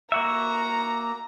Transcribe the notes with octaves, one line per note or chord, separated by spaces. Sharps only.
A#3 F#4 E5 A#5